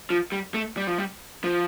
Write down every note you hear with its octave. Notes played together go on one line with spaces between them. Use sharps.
F3
G3
A3
G3
F3
G3
F3